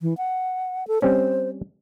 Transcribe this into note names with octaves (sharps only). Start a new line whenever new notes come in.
E3
F#5
A4
G3 C4 C#4 C5